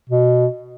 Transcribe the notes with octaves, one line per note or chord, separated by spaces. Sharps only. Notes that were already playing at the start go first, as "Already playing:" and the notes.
B2